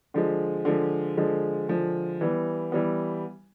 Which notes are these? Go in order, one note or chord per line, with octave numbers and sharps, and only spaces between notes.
D3 F3 G#3
D3 F3 G#3
D3 F3 G#3
D3 F3 G#3
E3 G3 B3
E3 G3 B3